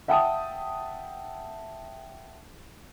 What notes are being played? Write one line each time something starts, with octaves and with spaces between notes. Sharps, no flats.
E5 F#5 G5 A5 D#6